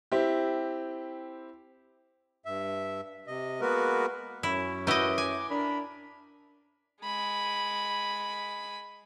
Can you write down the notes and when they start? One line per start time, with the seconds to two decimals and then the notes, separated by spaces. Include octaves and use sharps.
0.12 C4 E4 G4
2.46 G2 E5
3.27 C3 D#5
3.61 G#3 A#3 B3 F#4 A#4 B4
4.43 F#2 C#4 E4
4.87 E4 F#4 G4 B4 D#5
5.18 G#5 D6
5.50 D4 A#4 B5
7.03 G#3 B5